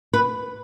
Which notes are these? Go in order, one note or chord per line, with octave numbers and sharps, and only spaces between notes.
B4